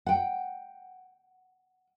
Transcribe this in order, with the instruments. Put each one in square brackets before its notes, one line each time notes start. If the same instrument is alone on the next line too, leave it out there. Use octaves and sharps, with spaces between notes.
[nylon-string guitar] F#5 G5